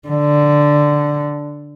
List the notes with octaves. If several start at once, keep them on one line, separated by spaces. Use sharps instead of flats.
D3